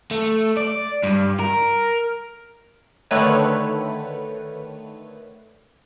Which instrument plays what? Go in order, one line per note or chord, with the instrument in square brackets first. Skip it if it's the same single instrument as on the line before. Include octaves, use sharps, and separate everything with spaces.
[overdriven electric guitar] A3
D5
G2
A#4
[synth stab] D3 D#3 A3 B4 C#5